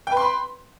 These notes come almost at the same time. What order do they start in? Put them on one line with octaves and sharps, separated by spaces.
G5 B4 C6 B5